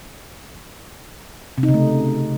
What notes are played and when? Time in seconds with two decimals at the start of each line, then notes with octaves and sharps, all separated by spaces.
1.58 C3
1.63 D#4
1.69 C#3
1.74 A3